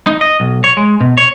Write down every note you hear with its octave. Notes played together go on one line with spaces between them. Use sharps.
D#4
D#5
B1
C#5
G#3
B2
C#5